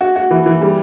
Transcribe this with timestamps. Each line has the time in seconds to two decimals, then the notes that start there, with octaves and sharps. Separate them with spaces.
0.01 F#4
0.16 F#4
0.31 E3
0.46 E3
0.61 G3